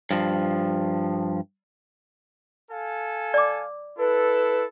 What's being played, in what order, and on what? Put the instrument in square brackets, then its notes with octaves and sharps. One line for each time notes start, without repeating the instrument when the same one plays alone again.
[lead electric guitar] G2 F3
[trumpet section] A4 F5 G#5
[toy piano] D5 D6
[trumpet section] E4 A4 [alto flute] B4